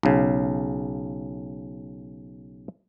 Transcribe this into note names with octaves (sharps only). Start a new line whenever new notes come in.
B1 C#3